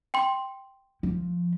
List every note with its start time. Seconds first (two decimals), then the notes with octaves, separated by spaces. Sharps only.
0.14 G5 C6
1.03 F3